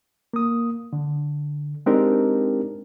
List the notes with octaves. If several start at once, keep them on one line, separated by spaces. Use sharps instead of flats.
A#3 D#6
D3
G#3 C4 D4 D#4 G4 A#4